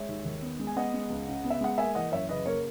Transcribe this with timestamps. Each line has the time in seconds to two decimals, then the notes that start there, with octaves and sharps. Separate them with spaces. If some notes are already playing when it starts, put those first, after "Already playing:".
Already playing: G#3 C#5 E5
0.08 D#2
0.25 D#3
0.42 B3
0.59 G#3
0.67 G#5
0.76 B3 D#5 F#5
0.94 G#3
1.10 C#2
1.28 C#3
1.44 B3
1.50 E5
1.61 G#3 F#5
1.78 A#3 E5 G#5
1.95 E3 D#5 F#5
2.12 F#2 C#5 E5
2.29 C#3 B4 D#5
2.46 A#3 A#4 C#5